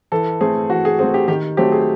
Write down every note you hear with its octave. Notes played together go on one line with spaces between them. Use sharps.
E3 A4
A3 C4 G#4
E3 F#4
G#4
A3 C4 G#4
G4
D#3 G4
F#3 A3 C4 G4
G#4